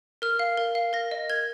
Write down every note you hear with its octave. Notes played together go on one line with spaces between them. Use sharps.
A#4 F6
F5
A#4
F5
A#4 A#6
D#5
A#4 G#6